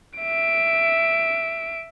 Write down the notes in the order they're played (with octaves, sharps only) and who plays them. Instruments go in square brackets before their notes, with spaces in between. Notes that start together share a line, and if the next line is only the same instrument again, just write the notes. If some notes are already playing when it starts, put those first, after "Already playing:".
[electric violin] E5 D7